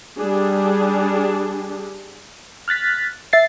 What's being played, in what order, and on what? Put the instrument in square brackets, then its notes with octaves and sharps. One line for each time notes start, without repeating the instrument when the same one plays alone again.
[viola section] G3 D4 G#4
[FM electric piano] F6 F#6 A6 B6
E5 A6 C7